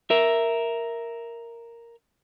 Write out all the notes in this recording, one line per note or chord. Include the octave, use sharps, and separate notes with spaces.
A#4 E5